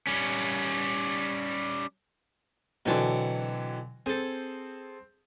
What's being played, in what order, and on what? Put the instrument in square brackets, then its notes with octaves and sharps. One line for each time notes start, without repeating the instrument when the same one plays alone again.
[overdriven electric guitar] G3 C#4
[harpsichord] B2 C4 A5 [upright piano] D3 E3 F#3
[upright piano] C4 [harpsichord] G#4 A4